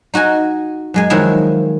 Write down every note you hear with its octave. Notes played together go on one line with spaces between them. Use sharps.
D#4 F#4 D#5 G#5
F#2 G#3 G#5
D#3 F3 F#3 G#3 E4 G#4